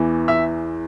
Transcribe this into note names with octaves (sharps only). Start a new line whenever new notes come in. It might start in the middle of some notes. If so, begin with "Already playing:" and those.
Already playing: E2 E3
E5